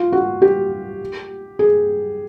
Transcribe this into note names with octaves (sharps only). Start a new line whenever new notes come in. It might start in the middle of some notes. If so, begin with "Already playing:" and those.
Already playing: F4
F#4
G4
G#4